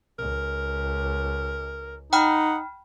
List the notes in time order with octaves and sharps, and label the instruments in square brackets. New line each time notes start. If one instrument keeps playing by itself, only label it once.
[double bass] C#2 [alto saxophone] A#4
[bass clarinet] D#4 [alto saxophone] F#5 [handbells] G5 B5 F6